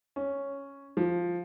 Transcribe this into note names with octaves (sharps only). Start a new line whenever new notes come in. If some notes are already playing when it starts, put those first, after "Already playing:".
C#4
F3